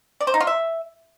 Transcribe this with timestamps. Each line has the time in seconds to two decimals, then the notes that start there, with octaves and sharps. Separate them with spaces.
0.21 D5
0.27 C5
0.34 D#4
0.41 F4
0.47 E5